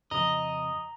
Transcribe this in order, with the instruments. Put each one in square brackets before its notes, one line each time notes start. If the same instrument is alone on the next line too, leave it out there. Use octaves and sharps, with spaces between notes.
[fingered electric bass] F2 C#3 F3 [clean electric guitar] D#5 [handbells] A#5